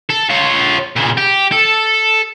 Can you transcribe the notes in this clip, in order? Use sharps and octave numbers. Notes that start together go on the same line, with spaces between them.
A4
F4 C#5
A#2 C#3
G4
A4